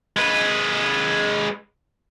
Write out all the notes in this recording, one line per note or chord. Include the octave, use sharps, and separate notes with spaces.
G#3 B4